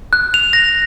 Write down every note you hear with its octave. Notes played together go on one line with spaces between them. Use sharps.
F#6
F7
A#6